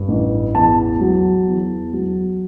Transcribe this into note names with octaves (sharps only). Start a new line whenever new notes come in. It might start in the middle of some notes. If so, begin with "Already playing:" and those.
Already playing: G2
A1
E2 A5
F#3
E2
F#3